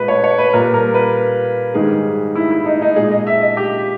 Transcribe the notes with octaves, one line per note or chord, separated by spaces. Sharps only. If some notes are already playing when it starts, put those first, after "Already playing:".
Already playing: A#2 G#3 B4
C#5
C#5
B4
A#2 G3 A#4
A#4
B4
G#2 D#3 G3 G#4
E4
E4
D#4
D#4
A#2 G#3 G#4
D#5
E5
D#5
G4